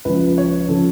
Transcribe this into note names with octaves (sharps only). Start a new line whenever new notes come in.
C#2 C#3 F3 B4
C#5
C#3 F3 A4